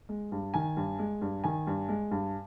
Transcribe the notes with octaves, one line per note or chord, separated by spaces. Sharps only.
G#3
G2
D#3 G#5
G2
G#3
G2
D#3 G#5
G2
G#3
G2